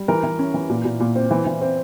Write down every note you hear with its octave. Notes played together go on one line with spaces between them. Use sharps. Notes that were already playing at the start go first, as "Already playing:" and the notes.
Already playing: G3
E3 A#4
E3
C#4
E3
A#2
A#2
A#2
C4
E3
E3
C4